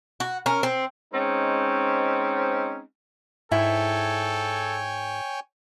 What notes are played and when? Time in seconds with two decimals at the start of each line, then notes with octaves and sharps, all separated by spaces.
0.20 F#4
0.46 C#4 A#4
0.63 C4
1.13 G#3 C4 C#4 D#4 C5
3.52 G#2 E4 A4 C#5 G5 G#5